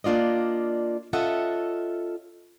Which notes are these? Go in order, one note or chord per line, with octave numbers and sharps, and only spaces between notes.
A#3 D4 F4 D5 D#5
C#4 F4 A4 D#5 E5 F#5